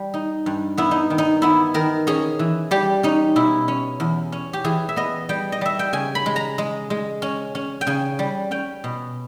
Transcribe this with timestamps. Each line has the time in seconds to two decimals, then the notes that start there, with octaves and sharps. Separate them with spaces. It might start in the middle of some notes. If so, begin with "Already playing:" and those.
Already playing: G3
0.14 D#4
0.46 G2
0.77 B3 E4
0.91 D#4
1.10 D#3
1.18 D#4
1.42 B3 E4
1.74 D#3 A#4
2.07 C#4 G#4
2.39 E3
2.71 G3 G4
3.03 C#4 D#4
3.36 B2 E4
3.68 C#4
4.00 E2
4.32 C#4
4.53 G4
4.64 E3 G#4
4.89 E5
4.96 B3 D#5
5.29 G3 G5
5.52 D#5
5.61 G3 E5
5.79 G5
5.93 C#3 G#5
6.15 B5
6.26 G#3
6.36 A#5
6.58 G#3
6.90 G#3
7.22 C#4
7.55 C#4
7.81 G5
7.87 C#3 G#5
8.19 G3
8.51 C#4 G5
8.84 B2